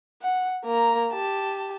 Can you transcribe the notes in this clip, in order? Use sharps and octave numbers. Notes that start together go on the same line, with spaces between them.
F#5
A#3 A#5
G4 A5